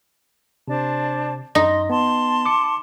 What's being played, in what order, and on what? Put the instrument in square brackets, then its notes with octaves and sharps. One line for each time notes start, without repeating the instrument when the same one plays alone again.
[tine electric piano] C3 [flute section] D4 C5 A5
[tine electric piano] F#2 A#6 [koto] D#4 [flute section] C6
[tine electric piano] B3 [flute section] A5 C6
[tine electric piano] D6 C#7